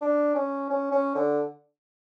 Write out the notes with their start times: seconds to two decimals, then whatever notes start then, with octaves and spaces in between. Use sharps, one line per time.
0.01 D4
0.35 C#4
0.70 C#4
0.91 C#4
1.15 D3